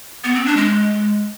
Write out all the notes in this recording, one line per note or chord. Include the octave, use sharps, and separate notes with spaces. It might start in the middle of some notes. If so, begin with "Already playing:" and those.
B3
C4
D4
G#3